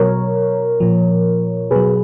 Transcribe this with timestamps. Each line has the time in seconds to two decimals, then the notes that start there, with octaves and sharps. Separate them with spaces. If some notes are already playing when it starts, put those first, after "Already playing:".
Already playing: B2 F#3 A#4 C#5
0.80 A#2 F3
1.71 B2 F#3 G#4 B4